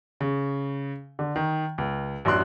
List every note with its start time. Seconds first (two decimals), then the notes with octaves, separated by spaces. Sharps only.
0.21 C#3
1.19 D3
1.36 D#3
1.78 C#2
2.25 A1 F#2 D4 C6 F#6